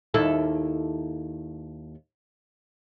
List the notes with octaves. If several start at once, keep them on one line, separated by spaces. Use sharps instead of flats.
D#2 E4 A4